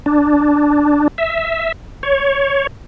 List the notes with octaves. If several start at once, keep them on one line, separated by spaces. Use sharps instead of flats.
D4
E5
C#5